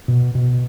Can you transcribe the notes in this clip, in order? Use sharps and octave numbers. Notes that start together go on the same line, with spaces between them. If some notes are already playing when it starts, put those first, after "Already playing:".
B2
B2